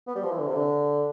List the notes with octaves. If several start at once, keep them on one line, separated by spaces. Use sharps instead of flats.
B3
G3
F3
E3
D3
C3
D3